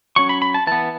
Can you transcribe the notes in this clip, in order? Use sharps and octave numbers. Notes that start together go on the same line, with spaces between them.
F#3 C#4 C#6
B5
B5
A5
E3 B3 A5